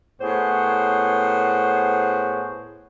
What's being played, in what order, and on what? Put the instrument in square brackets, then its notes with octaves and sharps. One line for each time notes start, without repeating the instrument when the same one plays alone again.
[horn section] A2 B3 G#4 C5 C#5 F#5